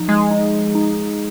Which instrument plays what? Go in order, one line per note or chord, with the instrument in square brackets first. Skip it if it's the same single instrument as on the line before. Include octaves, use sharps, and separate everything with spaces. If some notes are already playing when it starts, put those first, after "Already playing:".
Already playing: [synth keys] F3 D#4
[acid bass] G#3
[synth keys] D#4
D#4